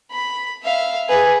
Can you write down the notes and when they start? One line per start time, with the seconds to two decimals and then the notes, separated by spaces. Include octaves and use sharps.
0.12 B5
0.63 E5 F5
1.09 G#4 B4